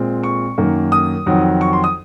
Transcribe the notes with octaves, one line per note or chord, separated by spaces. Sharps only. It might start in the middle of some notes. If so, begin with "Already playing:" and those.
Already playing: A#2 G#3 C4
C#6
F#2 D#3 A#3
D#6
F2 D#3 F#3
C#6
C6
D#6